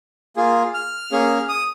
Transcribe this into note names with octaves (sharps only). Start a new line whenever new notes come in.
A#3 F4 G#4
F6
A#3 C#4 G#4
D#6